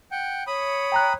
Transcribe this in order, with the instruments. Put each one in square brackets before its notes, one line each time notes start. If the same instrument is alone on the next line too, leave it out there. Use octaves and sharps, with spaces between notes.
[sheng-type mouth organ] F#5 G5
[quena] C#5 [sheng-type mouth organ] B5 D#6
[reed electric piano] G5 A#5 F#6